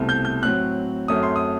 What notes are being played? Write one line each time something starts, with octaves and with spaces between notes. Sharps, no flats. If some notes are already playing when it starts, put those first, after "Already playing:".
Already playing: C2 B2 A3 C4
G6
G6
A2 F#3 C4 F#6
F#2 F#3 A3 C4 D#6
C6
D#6